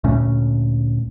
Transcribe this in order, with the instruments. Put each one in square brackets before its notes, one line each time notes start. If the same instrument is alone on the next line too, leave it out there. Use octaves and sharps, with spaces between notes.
[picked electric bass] D2 A#2 A3 C#4